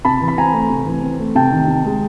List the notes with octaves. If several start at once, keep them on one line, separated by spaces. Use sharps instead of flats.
C3 A5 B5
E3
B5
C4 G#5 A#5
A3
C3
E3
C4
A3
C3 G5 A5
D#3
C3
G#3